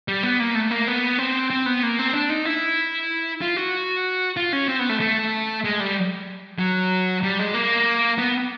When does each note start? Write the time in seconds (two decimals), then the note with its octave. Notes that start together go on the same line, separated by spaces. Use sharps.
0.08 G3
0.23 B3
0.40 A#3
0.55 A3
0.71 A#3
0.88 B3
1.18 C4
1.50 C4
1.66 B3
1.83 A#3
1.99 C4
2.14 D4
2.30 D#4
2.45 E4
3.41 F4
3.57 F#4
4.37 F4
4.53 C#4
4.68 C4
4.79 B3
4.89 A3
5.00 A3
5.64 G#3
5.80 G3
6.59 F#3
7.23 G3
7.39 G#3
7.54 A#3
8.18 B3